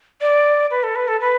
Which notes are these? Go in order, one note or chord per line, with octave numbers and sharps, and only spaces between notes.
D5
B4
A4
B4
A4
B4